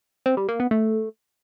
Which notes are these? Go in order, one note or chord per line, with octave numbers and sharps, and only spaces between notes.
C4
G3
A#3
B3
A3